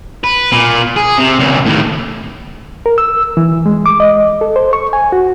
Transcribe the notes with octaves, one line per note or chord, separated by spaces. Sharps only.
B4
A#2
G#4
C3
C#2 A#2
D#2 A2
A#4
E6
E3
G#3
D6
D#5
A4
C5
C#6
G#5
F#4